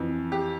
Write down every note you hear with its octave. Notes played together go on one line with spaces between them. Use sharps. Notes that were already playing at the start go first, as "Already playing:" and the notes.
Already playing: F2 E3
G4